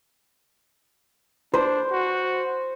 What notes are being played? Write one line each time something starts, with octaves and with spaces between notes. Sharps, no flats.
D4 C5
F#4